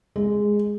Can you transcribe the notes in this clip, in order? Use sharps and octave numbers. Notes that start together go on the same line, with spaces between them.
G#3